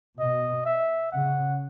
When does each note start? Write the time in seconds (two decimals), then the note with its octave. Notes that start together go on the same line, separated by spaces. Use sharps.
0.20 B2 D#5
0.66 E5
1.12 C#3 F#5